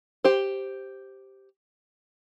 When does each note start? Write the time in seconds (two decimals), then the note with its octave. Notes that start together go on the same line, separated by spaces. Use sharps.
0.24 G4 C5